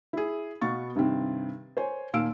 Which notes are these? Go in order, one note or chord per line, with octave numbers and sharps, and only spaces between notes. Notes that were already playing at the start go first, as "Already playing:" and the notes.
E4 G#4
B2 B3 F5 C#6 A6
G2 C3 D#3 C4
C5 C#5 G#5
D#2 A#2 F5 E6 D7